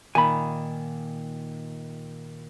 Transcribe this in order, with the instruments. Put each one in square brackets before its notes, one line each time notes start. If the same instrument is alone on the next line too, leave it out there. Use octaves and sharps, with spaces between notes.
[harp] A#2 D#3 [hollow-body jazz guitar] G#5 B5